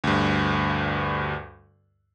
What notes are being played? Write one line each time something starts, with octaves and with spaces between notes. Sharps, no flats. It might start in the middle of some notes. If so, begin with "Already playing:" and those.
D2 G2